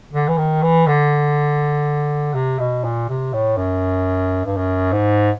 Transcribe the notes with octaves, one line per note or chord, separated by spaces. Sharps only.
D3
E3
D#3
E3
D3
C3
B2
A#2
C3
A2
F#2
G2
F#2
G#2